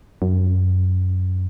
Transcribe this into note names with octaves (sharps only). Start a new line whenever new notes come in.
F#2